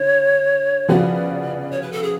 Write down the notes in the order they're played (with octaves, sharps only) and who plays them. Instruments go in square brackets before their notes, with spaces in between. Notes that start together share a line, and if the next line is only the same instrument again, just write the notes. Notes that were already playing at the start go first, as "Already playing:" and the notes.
Already playing: [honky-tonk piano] D3 [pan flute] C#5
[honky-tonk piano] C#3 F3 B3 F#4 [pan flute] D5
[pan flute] C#5
B4
A4
G#4